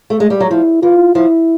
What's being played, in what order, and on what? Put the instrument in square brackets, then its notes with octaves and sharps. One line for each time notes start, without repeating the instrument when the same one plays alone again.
[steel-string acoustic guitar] A3
G#3
G3
F#3
[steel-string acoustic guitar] F3 [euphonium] E4
[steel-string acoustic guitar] E3 [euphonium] F4
[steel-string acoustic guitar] F3 [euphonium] E4